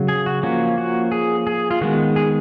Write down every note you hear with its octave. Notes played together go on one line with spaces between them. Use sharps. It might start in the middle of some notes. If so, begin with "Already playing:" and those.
Already playing: C#3 F#3 C#4
G#4
F#4
F3 A#3 C#4 F#4
F#4
G#4
G#4
F4
D#3 G#3 B3 F#4
G#4